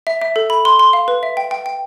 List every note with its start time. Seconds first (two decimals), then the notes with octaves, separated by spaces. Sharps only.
0.07 E5
0.22 E5
0.36 A4
0.50 B5
0.65 C6
0.79 C6
0.93 F5
1.08 B4
1.23 E5
1.37 G5
1.51 G5
1.66 G5